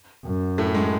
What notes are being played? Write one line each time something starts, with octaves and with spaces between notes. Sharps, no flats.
F#2
A2 A3
G#3